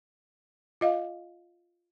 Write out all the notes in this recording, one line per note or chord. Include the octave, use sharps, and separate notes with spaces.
F4 D#5 F5